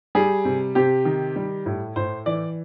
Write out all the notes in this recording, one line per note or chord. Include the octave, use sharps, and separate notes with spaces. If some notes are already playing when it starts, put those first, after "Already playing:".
G3 G#4
C3
C3 G4
D#3
G3
A2
A2 C5
E3 D5